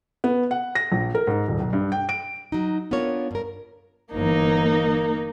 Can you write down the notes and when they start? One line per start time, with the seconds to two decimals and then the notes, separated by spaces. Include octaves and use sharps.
0.24 B3
0.51 F#5
0.75 A#6
0.92 A#1
1.15 A#4
1.27 G#2
1.48 D#1
1.60 B1
1.73 G2
1.92 G5
2.09 D7
2.52 F#3 D#4
2.91 B3 D4 F4 A#4 C#5
3.31 G2 A#4
4.13 G1 E3 A#3 D#4